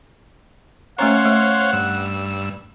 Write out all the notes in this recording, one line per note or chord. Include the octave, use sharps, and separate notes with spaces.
A3 C#4 C5 C#5 F5 F#5 A#5
A3
G2 E6